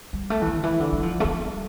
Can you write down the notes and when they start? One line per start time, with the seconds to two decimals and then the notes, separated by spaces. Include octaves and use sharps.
0.13 G3
0.30 A3
0.42 E3
0.47 D3
0.64 E3
0.80 D3
0.92 G3
1.03 F3
1.20 A3
1.24 G3